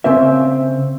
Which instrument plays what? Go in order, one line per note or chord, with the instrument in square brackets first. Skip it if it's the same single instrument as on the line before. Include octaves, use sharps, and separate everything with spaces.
[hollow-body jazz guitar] C#3 C4 C5 E5